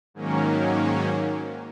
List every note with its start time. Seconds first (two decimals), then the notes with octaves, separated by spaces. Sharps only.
0.14 G#2 D#3 F#3 A#3 C#4